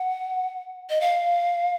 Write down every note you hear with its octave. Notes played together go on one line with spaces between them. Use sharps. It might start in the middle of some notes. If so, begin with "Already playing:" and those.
Already playing: F#5
D#5
F5